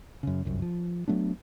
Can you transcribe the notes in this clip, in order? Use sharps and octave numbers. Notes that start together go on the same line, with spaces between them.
F#2 C#3
G1 C2 F#2
F3
F#3 A3 B3 D4